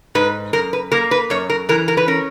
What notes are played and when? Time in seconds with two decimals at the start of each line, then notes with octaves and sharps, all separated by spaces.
0.15 G#2 B4
0.53 F#2 A#4
0.73 B4
0.92 A#3 A#4
1.11 B4
1.30 F#2 C#5
1.50 A#4
1.69 E3 A#4
1.88 A#4
1.97 B4
2.07 C#4 A#4